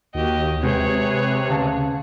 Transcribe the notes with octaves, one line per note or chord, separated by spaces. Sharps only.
D#2 F#4 G4 D#5
C3 G#3 C4 F#4 G#4 B4 C#5
D2 C#3 F5 A5